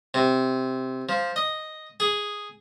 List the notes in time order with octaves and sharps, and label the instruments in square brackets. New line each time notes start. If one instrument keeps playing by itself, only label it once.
[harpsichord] C3
F3
D#5
G#4